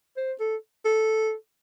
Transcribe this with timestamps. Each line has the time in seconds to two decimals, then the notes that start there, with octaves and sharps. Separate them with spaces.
0.16 C5
0.40 A4
0.85 A4